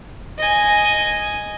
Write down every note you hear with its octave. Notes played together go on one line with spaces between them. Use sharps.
D#5 G#5